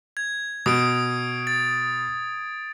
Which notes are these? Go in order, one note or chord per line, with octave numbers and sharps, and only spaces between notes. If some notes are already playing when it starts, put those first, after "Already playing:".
G#6
B2 D#6 D7
A6